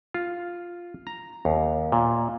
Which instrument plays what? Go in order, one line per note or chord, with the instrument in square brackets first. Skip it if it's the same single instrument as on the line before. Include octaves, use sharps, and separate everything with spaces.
[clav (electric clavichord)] F4
A#5
D#2
A#2